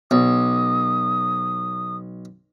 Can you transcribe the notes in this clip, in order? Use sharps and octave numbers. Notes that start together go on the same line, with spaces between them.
B1 D#6